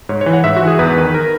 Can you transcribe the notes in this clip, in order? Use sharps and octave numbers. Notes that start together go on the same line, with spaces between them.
G#2 C#5
C#5
E3
F#5
G#2 E5
F#4
E3
G#4
E2 B4
D#3
A#4